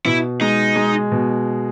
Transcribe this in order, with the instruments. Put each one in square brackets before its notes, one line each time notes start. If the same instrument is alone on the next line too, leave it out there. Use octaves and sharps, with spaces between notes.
[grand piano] B2 [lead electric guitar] E4
[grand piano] G#3 [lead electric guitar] D#4
[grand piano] G#3
B2